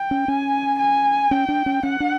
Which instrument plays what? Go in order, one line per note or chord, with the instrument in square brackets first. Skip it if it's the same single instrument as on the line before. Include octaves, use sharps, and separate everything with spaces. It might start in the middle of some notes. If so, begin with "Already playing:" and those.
Already playing: [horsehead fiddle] G5
[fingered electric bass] C#4
[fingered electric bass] C#4 [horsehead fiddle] G#5
[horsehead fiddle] G#5
[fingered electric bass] C#4 [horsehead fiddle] G5
[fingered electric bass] D4
C#4
[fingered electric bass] C#4 [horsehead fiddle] F#5
[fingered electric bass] D4